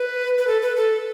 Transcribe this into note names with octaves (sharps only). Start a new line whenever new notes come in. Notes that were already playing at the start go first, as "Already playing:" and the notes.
Already playing: B4
B4
A4
B4
A4